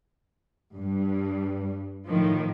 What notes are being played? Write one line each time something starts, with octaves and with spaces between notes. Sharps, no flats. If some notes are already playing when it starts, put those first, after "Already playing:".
G2
A2 D#3 F3